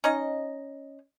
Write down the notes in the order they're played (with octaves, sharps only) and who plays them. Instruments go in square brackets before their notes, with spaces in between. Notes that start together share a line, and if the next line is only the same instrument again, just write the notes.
[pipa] C#4 D#4 D#5